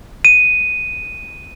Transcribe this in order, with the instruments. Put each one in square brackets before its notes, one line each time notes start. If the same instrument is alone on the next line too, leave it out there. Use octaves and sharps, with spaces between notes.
[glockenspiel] D#7